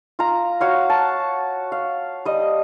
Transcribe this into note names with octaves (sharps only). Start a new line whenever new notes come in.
F4 A#5
F#4 C#5 F5
A5
F5
G3 D#5